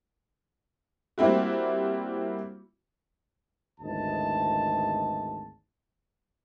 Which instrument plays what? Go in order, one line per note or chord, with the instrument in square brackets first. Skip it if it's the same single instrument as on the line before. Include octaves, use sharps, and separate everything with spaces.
[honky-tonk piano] G3 A#3 C4 E4 F#4
[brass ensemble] G#1 D2 E3 D#5 A5